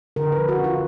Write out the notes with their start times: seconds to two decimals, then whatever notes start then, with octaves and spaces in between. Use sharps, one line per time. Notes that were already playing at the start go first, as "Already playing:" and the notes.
0.16 D3 A#4
0.32 B4
0.38 F3
0.49 F#4
0.59 C#4 F4